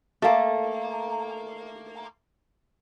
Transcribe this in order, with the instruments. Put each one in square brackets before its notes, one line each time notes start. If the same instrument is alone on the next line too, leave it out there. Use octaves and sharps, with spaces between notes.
[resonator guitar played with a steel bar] A3 A#3 [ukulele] A4 F5